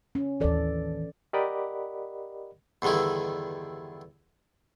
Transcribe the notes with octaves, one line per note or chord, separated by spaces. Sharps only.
C#4
A1 D#2 E3 A4 D5
G4 A#4 D5 D#5 F#5 B5
E2 G2 D3 D#3 E4